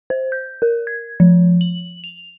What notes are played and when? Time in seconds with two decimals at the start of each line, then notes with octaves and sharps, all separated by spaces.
0.10 C5
0.32 G6
0.62 A#4
0.87 G#6
1.20 F3
1.61 F#7
2.04 F7